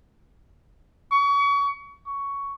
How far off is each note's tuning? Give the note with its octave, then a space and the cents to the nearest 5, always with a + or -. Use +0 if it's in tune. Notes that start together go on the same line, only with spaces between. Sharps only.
C#6 +30
C#6 +10